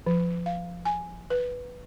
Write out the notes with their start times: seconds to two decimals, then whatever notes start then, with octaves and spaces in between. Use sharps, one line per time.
0.06 F3
0.46 F5
0.85 G#5
1.30 B4